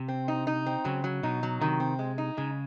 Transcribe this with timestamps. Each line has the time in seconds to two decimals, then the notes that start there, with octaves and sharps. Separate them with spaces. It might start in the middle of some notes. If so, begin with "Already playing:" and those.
Already playing: C3
0.08 C4
0.28 D#4
0.47 D#4
0.66 C4
0.85 C#3 F#3
1.04 F#3
1.23 B2 D#4
1.43 F#3
1.61 C3 D#3
1.80 C4
1.99 G#3
2.18 D#4
2.37 C#3 G#3